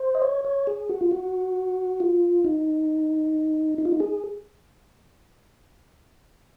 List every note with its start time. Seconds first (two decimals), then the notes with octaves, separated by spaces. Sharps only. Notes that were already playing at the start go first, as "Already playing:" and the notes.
Already playing: C5
0.15 D#5
0.22 C#5
0.45 C#5
0.67 G#4
0.89 F#4
1.01 F4
1.11 F#4
2.00 F4
2.44 D#4
3.78 D#4
3.85 F4
3.92 D#4
4.00 G#4